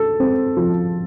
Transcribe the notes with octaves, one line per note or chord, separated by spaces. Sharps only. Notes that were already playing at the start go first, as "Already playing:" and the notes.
Already playing: A4
C4
F3